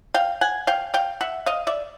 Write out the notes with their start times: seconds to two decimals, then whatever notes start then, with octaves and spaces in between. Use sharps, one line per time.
0.14 F5 G5
0.41 F#5 G#5
0.67 F5 G5
0.94 F5 G5
1.21 E5 F#5
1.46 D#5 F5
1.67 D5 E5